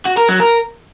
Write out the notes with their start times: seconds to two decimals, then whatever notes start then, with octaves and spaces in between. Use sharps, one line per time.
0.05 F#4
0.17 A#4
0.29 F#3
0.40 A#4